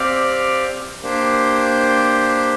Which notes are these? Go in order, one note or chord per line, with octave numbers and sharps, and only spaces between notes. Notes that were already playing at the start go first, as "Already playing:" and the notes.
Already playing: C4 G4 D5 F5
A#3 D4 G4 C5